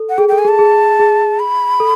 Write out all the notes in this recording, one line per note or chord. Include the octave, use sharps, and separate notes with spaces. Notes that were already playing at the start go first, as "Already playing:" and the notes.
Already playing: A4
F#5
G#4 G5
A4 G5
G#5
G#4
A5
G#4
G#4
B5
A4